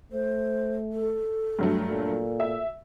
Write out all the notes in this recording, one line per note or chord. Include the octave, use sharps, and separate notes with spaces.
A3 C5
A4
G2 F#3 A3
A#2
E5